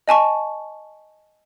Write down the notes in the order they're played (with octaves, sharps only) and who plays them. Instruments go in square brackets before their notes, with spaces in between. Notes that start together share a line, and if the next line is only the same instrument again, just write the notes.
[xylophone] D#5 G#5 A5 C#6